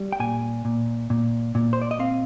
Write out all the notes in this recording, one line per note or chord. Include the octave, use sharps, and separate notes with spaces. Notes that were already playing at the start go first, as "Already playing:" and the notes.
Already playing: G3
G5
A#2 G#5
A#2
A#2
A#2
C5
D5
D#5
C4 F5